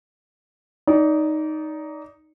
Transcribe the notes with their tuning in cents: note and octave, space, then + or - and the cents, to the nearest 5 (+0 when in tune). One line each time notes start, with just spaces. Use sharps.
D#4 +0 D5 -25